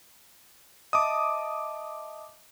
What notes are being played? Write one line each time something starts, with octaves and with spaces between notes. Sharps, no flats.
D#5 E5 A5 D6 D#6